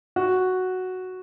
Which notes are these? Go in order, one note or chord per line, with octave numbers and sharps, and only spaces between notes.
F#4